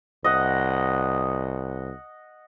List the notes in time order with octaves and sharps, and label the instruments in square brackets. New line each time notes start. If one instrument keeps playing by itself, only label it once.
[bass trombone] C2 [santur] D#5 F#5